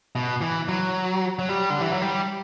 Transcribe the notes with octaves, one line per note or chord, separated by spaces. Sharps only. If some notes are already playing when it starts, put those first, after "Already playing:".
B2
E3
F#3
F#3
G3
D3
E3
F#3
G3